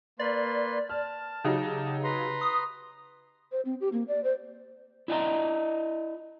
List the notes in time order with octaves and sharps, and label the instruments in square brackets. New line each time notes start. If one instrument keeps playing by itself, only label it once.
[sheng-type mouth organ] A#3 B4 C6 [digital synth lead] D5
[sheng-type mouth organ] A5 [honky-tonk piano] F6
[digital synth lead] C#3 [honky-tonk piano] F#3 D#4 G4
[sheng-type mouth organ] B4 A#5 C6
[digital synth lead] D#6
[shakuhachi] C5
C4
G4
A#3
D5
C5
[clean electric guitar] E4 D5 D#5 G5 A#5 C6